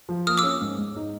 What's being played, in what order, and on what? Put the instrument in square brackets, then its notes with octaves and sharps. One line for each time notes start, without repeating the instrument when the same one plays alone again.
[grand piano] F3
[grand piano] A#3 [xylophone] D#6 F6
[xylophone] D6 E6
[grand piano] C#4
G#2
G#2
D#4